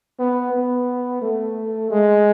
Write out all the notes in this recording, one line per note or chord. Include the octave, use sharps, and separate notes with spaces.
B3
B3
A3
G#3